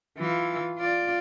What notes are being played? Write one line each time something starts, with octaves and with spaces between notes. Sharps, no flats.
E3 F4
F4 D5